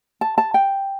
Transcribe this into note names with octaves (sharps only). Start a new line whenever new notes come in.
A5
A5
G5